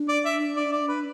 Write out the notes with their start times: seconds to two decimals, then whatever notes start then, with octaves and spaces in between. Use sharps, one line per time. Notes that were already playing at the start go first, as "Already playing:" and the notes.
Already playing: D4
0.08 D5
0.25 E5
0.57 D5
0.72 D5
0.89 B4